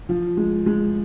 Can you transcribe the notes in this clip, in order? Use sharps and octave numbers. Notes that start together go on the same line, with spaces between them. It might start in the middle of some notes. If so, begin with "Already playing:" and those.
F3
G#3
G#3